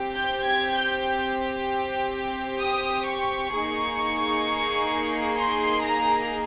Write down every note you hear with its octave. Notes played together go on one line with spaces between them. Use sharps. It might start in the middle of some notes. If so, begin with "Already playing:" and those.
Already playing: C4 G4
G6
G#6
G6
D#6
C#6
A#3 D#4 G#4
C6
A#5